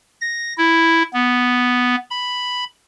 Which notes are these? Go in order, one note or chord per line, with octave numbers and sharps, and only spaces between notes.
A#6
E4
B3
B5